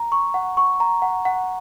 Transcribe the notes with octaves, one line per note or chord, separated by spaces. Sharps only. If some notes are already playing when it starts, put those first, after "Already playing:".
Already playing: A#5
C#6
F#5
C#6
A#5
F#5
F#5